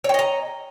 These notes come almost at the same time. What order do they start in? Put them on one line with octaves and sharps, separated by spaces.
C#5 G5 D#5 A#5